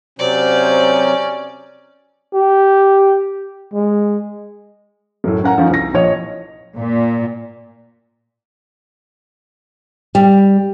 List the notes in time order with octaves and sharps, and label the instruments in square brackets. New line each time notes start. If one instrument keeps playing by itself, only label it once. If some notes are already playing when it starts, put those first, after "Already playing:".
[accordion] C3 F#3 [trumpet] C#4 [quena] C5 [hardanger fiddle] D5
[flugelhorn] G4
G#3
[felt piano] F#2 A2
C#4 A#4 F#5 A#5
F3 C#4 D#4
C2 A#6
A#1 C#5 D#5
[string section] A#2
[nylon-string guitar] G3